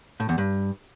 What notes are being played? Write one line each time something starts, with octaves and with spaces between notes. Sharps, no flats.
A2
E2
G2